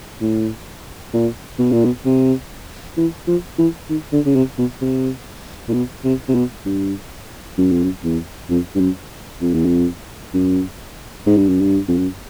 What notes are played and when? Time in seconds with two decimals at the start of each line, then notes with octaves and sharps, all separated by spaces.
0.21 A2
1.13 A#2
1.59 B2
1.72 A#2
1.85 B2
2.05 C3
2.97 E3
3.27 F3
3.58 E3
3.90 D#3
4.13 D3
4.26 C#3
4.36 C3
4.58 B2
4.82 C3
5.68 A#2
5.73 B2
6.04 C3
6.29 C3
6.35 B2
6.65 G2
7.58 F#2
7.71 F2
7.83 F#2
8.04 E2
8.50 F2
8.75 G2
8.80 F#2
9.41 F2
9.54 E2
9.65 F2
10.34 F#2
11.26 G#2
11.37 G2
11.49 F#2
11.61 G2
11.88 F2
11.97 F#2